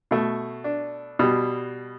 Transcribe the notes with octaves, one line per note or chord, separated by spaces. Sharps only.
B2 A3
D4
B2 G3